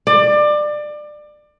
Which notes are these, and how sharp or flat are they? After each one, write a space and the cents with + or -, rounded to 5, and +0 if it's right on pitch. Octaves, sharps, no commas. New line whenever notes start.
D5 +25